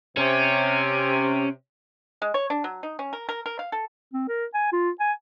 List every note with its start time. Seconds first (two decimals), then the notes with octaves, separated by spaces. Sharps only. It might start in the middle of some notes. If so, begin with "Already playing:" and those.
0.17 C3 C#4
2.22 G#3
2.34 C#5
2.50 D4
2.64 F#3
2.83 D#4
2.99 C#4
3.13 A#4
3.29 A#4
3.46 A#4
3.59 F5
3.72 A4
4.13 C4
4.28 A#4
4.54 G#5
4.72 F4
5.00 G#5